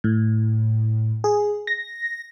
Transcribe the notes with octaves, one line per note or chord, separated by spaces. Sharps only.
A2
G#4
A#6